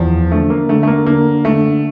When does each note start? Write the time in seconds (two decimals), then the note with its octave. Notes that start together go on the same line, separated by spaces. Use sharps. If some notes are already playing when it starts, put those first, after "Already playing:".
Already playing: E2 F3
0.32 D3 A3
0.50 A#3
0.69 D3 A3
0.83 A3
0.87 A#3
1.06 D3 A#3
1.45 D3 A3